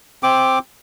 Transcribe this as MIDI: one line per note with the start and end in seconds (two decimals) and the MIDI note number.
0.23 0.59 60
0.23 0.59 86